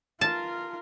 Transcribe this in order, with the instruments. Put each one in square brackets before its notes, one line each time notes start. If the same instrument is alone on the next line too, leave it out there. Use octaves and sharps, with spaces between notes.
[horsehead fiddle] F4 A#4 [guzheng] A5